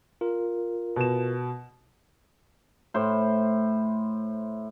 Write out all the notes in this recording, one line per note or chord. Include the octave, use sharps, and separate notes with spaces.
F4 A#4
B2 E7
A2 C5